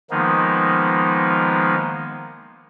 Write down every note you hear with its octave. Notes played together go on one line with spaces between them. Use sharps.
D#3 F3 G#3 A#3 B3 D#4